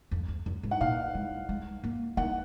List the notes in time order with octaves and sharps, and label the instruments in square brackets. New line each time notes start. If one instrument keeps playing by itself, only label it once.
[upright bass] F2
F2
F#2
G#2
[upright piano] F#5
[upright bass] A#2 [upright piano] F5
[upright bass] G#3
G#3
A#3
[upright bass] A#3 [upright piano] F#5